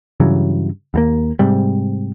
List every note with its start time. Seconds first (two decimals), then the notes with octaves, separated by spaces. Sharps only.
0.20 G2 C#3 E3 F#3
0.94 D#2 G3 A#3
1.39 G#2 C3 G3